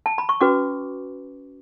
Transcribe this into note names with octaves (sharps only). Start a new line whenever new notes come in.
A5
B5
C#6
C#4 F#4 B4 D6